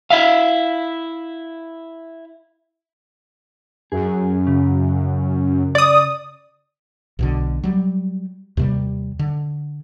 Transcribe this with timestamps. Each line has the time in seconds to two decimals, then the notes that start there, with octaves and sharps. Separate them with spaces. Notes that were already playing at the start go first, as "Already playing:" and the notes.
0.10 E4 E5 F5
3.92 F#2 G#4
4.47 C#3
5.75 D5 D#6
7.19 B1 B2 D3
7.64 F#3 G3
8.57 D#2 C3 G3
9.19 D3